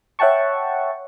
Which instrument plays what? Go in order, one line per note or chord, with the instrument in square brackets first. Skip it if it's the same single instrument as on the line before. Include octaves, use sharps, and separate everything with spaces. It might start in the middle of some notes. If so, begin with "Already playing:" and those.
[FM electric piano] C#5 E5 F#5 G5 A5 C#6